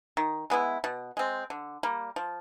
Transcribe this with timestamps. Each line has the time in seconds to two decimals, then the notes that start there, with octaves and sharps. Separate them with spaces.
0.17 D#3
0.50 G#3 B3 E4
0.84 B2
1.17 G#3 C4
1.50 D3
1.83 G3 A#3
2.16 F3